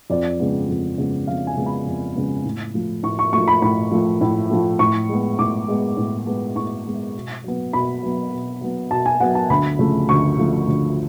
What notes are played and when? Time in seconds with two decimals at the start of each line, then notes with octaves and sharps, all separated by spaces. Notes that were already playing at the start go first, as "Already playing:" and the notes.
0.10 F2 D5
0.39 C#3 G#3 B3
0.68 F2
0.98 C#3 G#3 B3
1.27 F2 F5
1.47 G#5
1.57 C#3 G#3 B3
1.66 B5
1.86 F2
2.15 C#3 G#3 B3
2.44 A2
2.74 F3 A3
3.03 A2 C#6
3.19 C#6
3.33 F3 A3 C#6
3.48 B5
3.62 A2 B5
3.91 F3 A3
4.21 A2
4.50 F3 A3
4.79 A2 C#6
5.09 G#3 B3
5.38 A2 D6
5.68 G#3 B3
5.97 A2
6.26 G#3 B3
6.55 A2 C#6
6.85 G#3 B3
7.15 B2
7.44 F#3 B3
7.73 B2 B5
8.03 F#3 B3
8.33 B2
8.61 F#3 B3
8.91 B2 A5
9.06 G#5
9.20 F#3 B3 F#5
9.35 A5
9.50 D2 B5
9.79 C#3 F3 A3
10.09 D2 C#6
10.38 C#3 F3 A3
10.67 D2